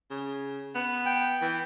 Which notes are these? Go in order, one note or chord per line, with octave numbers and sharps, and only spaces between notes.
C#3
B3
G5
E3